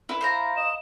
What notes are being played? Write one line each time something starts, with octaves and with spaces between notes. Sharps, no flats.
E4 B4
C5 F5 A#5
D#5 E7